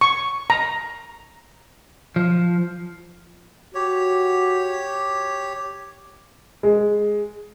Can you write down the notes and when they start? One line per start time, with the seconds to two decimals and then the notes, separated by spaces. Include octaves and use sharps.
0.01 C#6
0.50 A#5
2.16 F3
3.75 F#4 G4 C#5
6.63 G#3